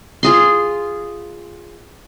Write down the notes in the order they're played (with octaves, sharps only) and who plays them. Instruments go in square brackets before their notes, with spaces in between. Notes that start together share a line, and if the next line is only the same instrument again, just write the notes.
[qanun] F4 G#4 C6